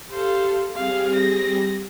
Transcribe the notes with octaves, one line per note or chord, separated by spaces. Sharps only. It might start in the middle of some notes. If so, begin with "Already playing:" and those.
G4 A4 C5 F5
G3 C4 G4 G#4 F5
A#6